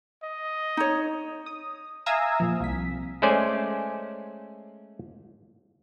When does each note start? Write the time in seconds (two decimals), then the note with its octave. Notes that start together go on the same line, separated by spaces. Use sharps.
0.23 D#5
0.77 D#4 C#5
1.46 D#6
2.06 E5 F5 G#5 A#5 D#6 E6
2.40 A#2 F3
2.60 C2 B6
3.22 G#3 A3 C#4 C5 D5 G#5